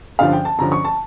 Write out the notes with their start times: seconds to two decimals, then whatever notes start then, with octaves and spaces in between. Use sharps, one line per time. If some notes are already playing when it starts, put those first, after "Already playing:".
0.19 G2 D3 F3 C#4 F5
0.33 G5
0.45 A5
0.58 G2 D3 F3 C#4 A#5
0.72 C#6
0.85 A5